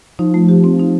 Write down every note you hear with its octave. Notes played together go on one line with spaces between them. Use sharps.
F3 D#4
A3
G4
C4
D#4